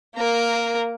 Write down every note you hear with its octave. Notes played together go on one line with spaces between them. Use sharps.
A#3 A#4